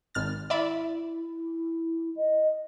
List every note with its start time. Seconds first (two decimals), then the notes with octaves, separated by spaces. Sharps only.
0.15 G#1 F6 A6
0.50 E4 D5 E5 B5
2.16 D#5